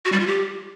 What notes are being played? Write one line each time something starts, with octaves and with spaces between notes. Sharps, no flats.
F#4
G3
F4
G4